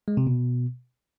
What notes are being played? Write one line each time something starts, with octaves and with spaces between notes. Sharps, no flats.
G#3
C3
B2